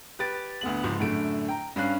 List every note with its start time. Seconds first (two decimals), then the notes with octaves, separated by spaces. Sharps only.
0.19 G4 B4 A6 D7
0.61 D2 B3 F#7
0.83 C#2 G#2 F3
0.99 F#2 A2 D3 A3 D7
1.49 G5 A#5
1.76 G2 C#4 F5 F#6 C7